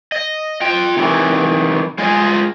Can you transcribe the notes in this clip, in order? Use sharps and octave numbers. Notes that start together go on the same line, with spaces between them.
D#5
F4 G5
C3 D#3 E3
G#3 F4 G#4 D#5